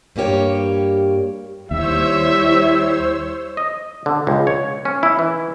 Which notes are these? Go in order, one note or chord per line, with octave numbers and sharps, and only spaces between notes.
G2 G3 A#3 G4 C#5
D#2 G3 E4 C5 C#5 E5 E6
D#5
D3
C#2
C#5
C#4
E4
E3